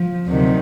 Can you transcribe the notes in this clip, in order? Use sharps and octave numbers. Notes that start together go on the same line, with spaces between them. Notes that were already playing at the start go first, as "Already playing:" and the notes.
Already playing: F3
D2 C3 D#3 F#3